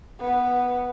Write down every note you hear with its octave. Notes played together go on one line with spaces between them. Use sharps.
B3